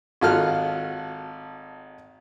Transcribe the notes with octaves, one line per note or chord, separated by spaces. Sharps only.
G#1 F4 F#4 A4 F6